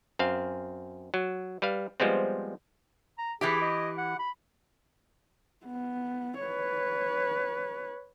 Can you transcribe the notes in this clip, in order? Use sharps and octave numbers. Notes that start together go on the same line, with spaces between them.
F#2 C4 F5
F#3
G3 B4 F5
F3 G3 G#3 B3 C4
A#5
E3 E4 G4 G#4
D#5
F#5
B5
B3
B4 C#5